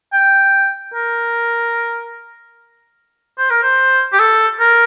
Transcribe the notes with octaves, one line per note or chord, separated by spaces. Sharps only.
G5
A#4
C5
A#4
C5
G4
A4
A#4